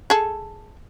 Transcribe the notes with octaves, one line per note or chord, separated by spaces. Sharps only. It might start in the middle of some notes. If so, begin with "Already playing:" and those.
G#4 A4